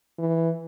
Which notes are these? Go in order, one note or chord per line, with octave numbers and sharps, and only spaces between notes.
E3